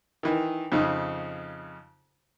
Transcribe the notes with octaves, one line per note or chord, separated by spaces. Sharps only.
D#3 E3
F2 C#3 D#4